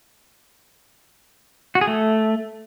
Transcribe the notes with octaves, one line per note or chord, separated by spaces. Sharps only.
F#4
G#4
A3